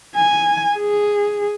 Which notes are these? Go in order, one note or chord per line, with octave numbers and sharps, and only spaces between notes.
G#5
G#4